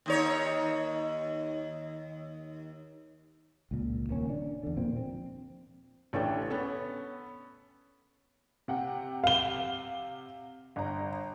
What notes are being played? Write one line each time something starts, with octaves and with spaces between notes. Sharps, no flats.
D#2 D#4 C#5
C#2 A#2
D#1 A#3 C#4
D4
E2 D3
A#2 F3 A#3 C4
C4
A1 C#4 D4 A4 G5
B3 C#4 A4
C3 F#5 G5
F5 G7
G1 A#5